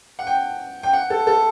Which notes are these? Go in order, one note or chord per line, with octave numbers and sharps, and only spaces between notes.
F#5
G5
G5
F#5
A4
A4